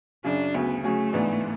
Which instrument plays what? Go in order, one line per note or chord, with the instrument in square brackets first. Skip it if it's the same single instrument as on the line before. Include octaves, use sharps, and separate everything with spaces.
[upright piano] F#2 C#3 F#3 [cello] D4
[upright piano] D2 C#3 F#3 [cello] B3
[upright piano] C#3 F#3 C#4 G#4 [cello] A3
[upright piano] A1 G#2 E3 B3 D4